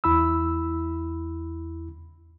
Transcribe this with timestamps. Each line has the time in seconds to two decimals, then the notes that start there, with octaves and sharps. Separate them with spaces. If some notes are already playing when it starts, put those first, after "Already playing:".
0.04 E2 E4 B5 E6